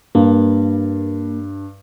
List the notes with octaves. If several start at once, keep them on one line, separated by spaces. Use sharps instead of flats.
G2 A#3